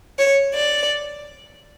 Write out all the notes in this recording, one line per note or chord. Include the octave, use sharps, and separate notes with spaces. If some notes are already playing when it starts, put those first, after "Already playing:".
C#5
D5